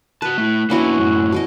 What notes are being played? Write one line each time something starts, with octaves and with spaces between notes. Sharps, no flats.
F#4 B4 A5
A3 E4
A#3 B3 C#4 D4 E4 F#4
F#2 A2
B2 E3 D#5